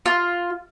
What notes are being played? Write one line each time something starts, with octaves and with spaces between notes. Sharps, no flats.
F4